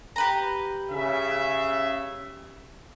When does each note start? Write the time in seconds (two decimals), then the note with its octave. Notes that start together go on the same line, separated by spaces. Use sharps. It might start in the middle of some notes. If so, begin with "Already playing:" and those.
0.16 G4 B4 A#5
0.91 C#3 E5